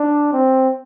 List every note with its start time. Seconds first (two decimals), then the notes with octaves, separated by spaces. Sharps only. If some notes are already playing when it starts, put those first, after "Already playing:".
Already playing: D4
0.33 C4